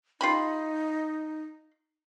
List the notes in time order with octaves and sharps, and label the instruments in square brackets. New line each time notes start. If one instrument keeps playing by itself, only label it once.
[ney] D#4 [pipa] F4 G4 B5